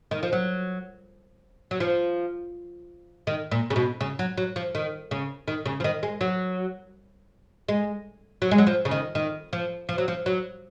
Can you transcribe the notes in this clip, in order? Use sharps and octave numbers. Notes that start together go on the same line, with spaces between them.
D#3
F3
F#3
F#3
F3
D#3
A#2
C#3
B2
C#3
F#3
F#3
F3
D#3
C#3
D#3
C#3
F3
D#3
G#3
F#3
G#3
F#3
G#3
F#3
F3
C#3
D#3
D#3
F3
F3
F#3
F3
F#3